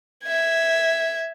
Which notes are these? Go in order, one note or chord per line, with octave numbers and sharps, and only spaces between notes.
E5 G#6